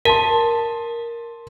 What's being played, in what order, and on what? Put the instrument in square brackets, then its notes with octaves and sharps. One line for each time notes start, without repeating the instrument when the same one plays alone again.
[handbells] A#4 [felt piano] A5 C6